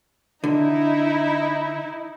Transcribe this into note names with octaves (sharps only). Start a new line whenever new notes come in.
D3 D#4 E4